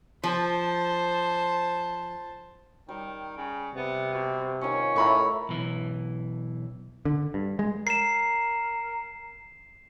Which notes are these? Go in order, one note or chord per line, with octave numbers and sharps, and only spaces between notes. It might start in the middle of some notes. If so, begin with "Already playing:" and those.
F3 C5 A5
D#3 G3
C#3
C3 B3
B2
D#3 C#4 F4 C#5
A2 A#4 E5 F5 A#5 B5 C#6
B1 E3
D3
G2
G#3
A#4 C7 E7